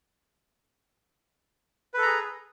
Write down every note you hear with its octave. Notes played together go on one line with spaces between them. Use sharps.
G#4 A4 B4 A#5